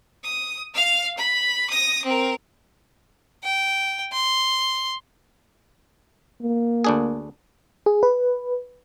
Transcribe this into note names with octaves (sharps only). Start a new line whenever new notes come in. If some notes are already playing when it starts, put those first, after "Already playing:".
D#6
F5 F6
B5
D#6 A#6
C4 A#4
G5
C6
A#3
D2 D4 G#4
G#4
B4